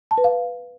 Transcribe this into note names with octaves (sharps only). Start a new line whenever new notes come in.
A5
B4
F5